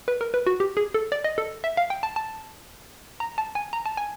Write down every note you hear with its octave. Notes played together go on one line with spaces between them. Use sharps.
B4
A#4
B4
F#4
G4
G#4
A4
D5
D#5
A4
E5
F5
G5
A5
A5
A#5
A5
G#5
A#5
A5
G#5